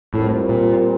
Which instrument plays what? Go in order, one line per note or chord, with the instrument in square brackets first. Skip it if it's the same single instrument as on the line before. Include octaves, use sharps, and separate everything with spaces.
[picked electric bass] A2 [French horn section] G3 C4 F4 A#4
[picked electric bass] A#2